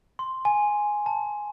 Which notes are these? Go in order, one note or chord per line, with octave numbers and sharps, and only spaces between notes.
C6
G#5
A5